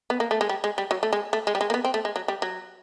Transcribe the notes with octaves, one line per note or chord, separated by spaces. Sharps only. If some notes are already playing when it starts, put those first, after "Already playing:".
B3
A#3
A3
G#3
G3
G#3
G3
F#3
A3
G#3
A3
G#3
G3
G#3
A#3
B3
C4
A3
G#3
F#3
G3
F#3